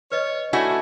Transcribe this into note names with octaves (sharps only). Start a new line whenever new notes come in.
B4 C#5 D#5
A3 D4 E4 F#4 G#5